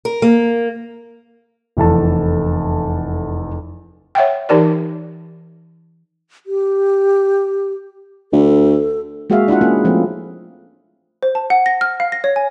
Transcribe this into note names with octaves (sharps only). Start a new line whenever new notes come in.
A#4
A#3
F1 E2 A4 A5
C#5 E5 F#5 G5
E3 D#4 G4 A#4 D5
G4
D2 A4
G#3 A#3 F#4 G#4 E5 F5
D4 E4 F4 F#5
A#3 C#4 E4 G#4
F3 A3 C4
C5
A5
F#5
A#6
F6
F5
A#6
C#5
G#5